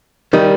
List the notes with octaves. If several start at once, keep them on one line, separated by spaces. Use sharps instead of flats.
D#3 G3